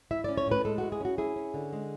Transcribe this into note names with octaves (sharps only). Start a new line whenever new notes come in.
E4 E5
C#4 D5
C#5
A2 B4
G#3 A4
F#4
E4
G#4
C#4 F#4
E4 G#4
C#4
D3
G#3